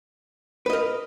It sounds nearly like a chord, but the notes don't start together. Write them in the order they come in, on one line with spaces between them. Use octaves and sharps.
B4 D#5 A#4